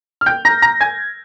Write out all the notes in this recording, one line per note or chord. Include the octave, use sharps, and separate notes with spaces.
F6
G5 G6
A#5 A#6
A#5 A#6
G#5 G#6